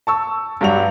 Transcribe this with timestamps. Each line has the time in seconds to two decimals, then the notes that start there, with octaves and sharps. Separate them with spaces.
0.07 A5 C#6 E6
0.61 G2 F#3 G3 F#4 F7